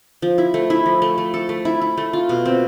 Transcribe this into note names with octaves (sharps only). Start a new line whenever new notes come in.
F3
E4
A3
E4
F3
A3
A3
A4
A3
E4
E4
A3
F4
B2
C4